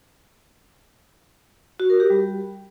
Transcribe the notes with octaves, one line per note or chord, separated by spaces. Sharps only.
F#4
A#4
G4
G3